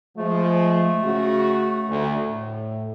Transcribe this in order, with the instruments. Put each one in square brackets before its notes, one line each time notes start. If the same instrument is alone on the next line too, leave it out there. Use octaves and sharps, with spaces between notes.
[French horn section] F3 G#3 [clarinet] A3
[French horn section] C#3 F#4
D2
A2